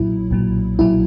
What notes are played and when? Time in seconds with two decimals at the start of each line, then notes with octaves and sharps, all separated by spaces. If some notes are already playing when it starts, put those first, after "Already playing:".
Already playing: B1 A#2 F#3 E4
0.31 B1 A#2 F#3
0.79 B1 A#2 F#3 E4